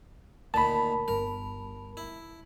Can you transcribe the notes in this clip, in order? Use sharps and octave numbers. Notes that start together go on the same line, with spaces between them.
D2 A#2 D#3 A5 B5
G1 A#4
E4